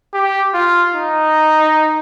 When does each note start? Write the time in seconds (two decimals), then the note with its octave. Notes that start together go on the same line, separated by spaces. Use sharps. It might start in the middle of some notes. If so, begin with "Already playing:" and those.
0.14 G4
0.54 F4
0.95 D#4